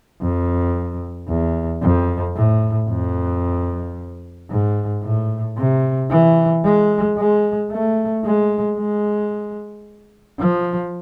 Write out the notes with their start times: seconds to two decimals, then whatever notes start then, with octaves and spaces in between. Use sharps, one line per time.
0.22 F2
1.29 E2
1.83 F2
2.36 A2
2.89 F2
4.50 G#2
5.03 A2
5.58 C3
6.11 E3
6.65 G#3
7.18 G#3
7.72 A3
8.25 G#3
8.78 G#3
10.39 F3